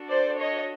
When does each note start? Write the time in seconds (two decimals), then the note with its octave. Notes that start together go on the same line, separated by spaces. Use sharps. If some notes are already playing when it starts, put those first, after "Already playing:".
Already playing: D4 F#4 A4
0.09 C5 D5
0.39 C#5 D#5